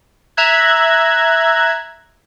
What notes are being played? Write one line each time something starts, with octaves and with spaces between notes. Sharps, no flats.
E5 A#5 E6 F#6 G#6